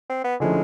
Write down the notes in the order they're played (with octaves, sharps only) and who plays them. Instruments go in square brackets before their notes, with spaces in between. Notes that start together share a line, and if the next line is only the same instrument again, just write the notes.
[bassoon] C4
B3
[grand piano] D3 F3 A3 C#4 E4 [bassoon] G#3